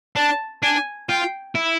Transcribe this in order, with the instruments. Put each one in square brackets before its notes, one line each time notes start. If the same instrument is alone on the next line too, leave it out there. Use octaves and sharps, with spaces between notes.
[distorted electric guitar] D4 [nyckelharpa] A5
[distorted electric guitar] D4 [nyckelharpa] G#5
[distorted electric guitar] F4 [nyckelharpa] G5
[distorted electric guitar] E4